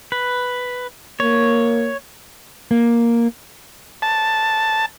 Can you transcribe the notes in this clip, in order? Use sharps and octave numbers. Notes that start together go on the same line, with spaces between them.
B4
A#3 C#5
A#3
A5